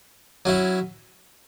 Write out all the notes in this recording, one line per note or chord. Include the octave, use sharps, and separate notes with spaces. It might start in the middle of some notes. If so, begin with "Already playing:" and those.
F#3 C#4 E4